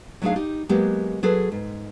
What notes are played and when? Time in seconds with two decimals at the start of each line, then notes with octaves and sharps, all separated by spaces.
0.22 F#3 A3 D4 D#4 G#4 F5
0.36 D#4 G4
0.69 F#3 G#3 A#3 B3 G4
1.23 F#3 G#4 A4 B4
1.52 G#2